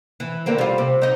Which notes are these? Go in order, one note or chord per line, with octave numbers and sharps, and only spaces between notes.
E3
D3 A#3 C4
G3 F4
C3
D#4 D#5